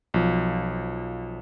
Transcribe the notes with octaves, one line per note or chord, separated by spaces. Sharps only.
B1 F3